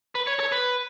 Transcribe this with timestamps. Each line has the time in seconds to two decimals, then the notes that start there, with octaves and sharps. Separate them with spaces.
0.15 B4
0.27 C#5
0.40 C#5
0.52 B4